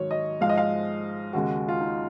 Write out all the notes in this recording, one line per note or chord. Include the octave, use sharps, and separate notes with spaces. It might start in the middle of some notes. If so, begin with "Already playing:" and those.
Already playing: G#2 D#3 F#3 C#5
D#5
G#2 F3 G#3 F5
D#5
F5
D#2 C#3 G#3 F#4
F4
D#4